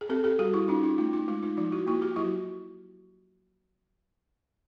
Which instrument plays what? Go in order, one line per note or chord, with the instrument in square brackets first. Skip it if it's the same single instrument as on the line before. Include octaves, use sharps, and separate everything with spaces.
[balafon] G#4
C4 G4 A4
G4 A4
G3 F#4 G#4
E4 F#4
C#4 D#4 F4
D#4 F4
A3 D#4 F4
D#4 F4
G#3 D#4 F4
D#4 F4
F3 D#4 F4
E4 F#4
A#3 E4 F#4
F4 G4
F#3 E4 F#4